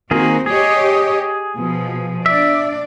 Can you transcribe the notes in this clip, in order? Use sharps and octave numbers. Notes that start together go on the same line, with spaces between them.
D#3 A#3 C4 F#4 G#4
G4 G#4 C#5 D#5
B2 F3
D4 D5 E5